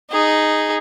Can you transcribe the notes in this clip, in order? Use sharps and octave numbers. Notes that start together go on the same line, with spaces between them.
D#4 G#4